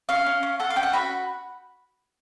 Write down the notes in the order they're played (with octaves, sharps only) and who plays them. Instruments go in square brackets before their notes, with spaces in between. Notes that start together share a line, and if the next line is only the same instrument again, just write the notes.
[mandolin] C#4 F5
C#4
C#4
A4 F#5
F5
C#4 G5
F#5
F#4 B5